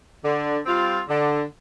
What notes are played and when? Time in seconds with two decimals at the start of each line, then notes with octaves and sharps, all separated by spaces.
0.23 D3
0.66 G3 C4 F4
1.08 D3